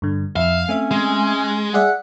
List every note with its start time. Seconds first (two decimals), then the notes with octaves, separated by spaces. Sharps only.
0.02 G2 D3
0.36 F2 E5 F5
0.69 A3 C4 C#4 E5
0.91 G#3
1.74 G#4 D5 E5 F#5